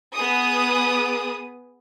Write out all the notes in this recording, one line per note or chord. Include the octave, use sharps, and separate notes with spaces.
B3 G#4 D#6